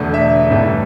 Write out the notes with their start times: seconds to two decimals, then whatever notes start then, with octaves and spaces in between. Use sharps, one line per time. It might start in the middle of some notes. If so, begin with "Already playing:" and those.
Already playing: E1 E2 D3 A3
0.14 E5
0.50 A1 G2 E3 A3